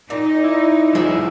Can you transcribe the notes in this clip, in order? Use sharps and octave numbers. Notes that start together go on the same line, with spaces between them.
A#2 D#4
E4
F3 G3 E4 F4 G#4 E5